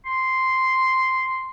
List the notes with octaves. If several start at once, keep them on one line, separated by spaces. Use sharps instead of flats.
C6